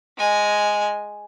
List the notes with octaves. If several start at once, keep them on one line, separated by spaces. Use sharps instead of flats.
G#3 G#5